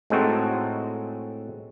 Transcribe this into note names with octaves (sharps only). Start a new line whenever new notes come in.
A2 G#3 C4 D#4 F#4 A4